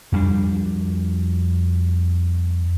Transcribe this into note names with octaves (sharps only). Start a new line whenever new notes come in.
F2 G3 D4